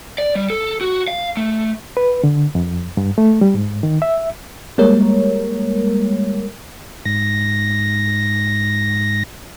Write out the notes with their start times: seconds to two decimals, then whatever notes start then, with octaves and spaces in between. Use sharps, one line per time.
0.18 D5
0.35 G3
0.50 A4
0.81 F#4
1.08 F5
1.37 A3
1.97 B4
2.24 D3
2.55 F2
2.97 G2
3.18 A3
3.41 G3
3.54 G#2
3.83 D#3
4.02 E5
4.78 G3 G#3 A#3 A#4 C#5
7.05 G#2 A#6